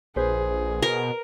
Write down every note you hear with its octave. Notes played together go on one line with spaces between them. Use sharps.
A#1 G#4 B4 C5
B2 A#4